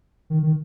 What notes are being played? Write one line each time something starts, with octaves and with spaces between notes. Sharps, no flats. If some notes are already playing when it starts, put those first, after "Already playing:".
D#3
D#3